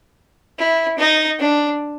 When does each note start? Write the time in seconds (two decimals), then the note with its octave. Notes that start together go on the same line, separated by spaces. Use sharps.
0.59 E4
0.99 D#4
1.39 D4